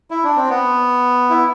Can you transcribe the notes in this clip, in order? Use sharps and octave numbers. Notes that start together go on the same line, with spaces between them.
E4
D4
C4
B3
E4